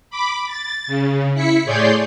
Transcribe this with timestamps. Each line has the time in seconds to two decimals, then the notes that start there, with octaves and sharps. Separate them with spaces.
0.10 B5 D6
0.47 A6
0.87 C#3
1.34 E4 B6 C#7
1.65 A2 G#4 C#5 D5 C6 G6